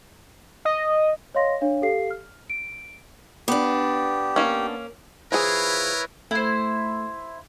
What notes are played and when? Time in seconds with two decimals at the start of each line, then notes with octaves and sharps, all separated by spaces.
0.65 D#5
1.35 C#5 D#5 F5 C6 A#6
1.61 D4 C#5 F5
1.82 G4 A4 F5 C7
2.11 F6
2.50 D7
3.48 B3 D4 G4
4.36 A#3 C#4
5.32 F3 E4 G#4 A#4 B4 C#5
6.31 A3 E4 C5